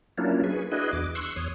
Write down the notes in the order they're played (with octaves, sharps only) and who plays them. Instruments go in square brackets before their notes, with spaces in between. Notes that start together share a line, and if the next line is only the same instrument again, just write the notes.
[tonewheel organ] F#3 A#3 C#4 D4 E4 F4
G#4 B4 C#6
D4 E4 F#4 G#4 B4 D#5
E2 D6
C6 C#6 E6 F#6
E2 C#5 D#6